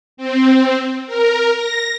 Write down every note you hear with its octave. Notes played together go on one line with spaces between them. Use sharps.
C4
A#4
A#6